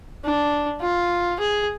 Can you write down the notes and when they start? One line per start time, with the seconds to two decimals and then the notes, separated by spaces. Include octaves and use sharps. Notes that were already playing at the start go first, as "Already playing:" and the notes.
0.25 D4
0.81 F4
1.40 G#4